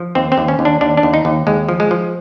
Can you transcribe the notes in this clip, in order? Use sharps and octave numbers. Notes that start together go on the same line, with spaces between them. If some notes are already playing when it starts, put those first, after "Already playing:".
Already playing: F3
D#2 C4
C4
D#2
C#4
D#2
D4
D#2 D4
D4
D#2
D#4
D#2
D#2 G#3
F3
G#3
F3